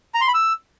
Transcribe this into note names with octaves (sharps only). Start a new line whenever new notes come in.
A#5
C6
B5
E6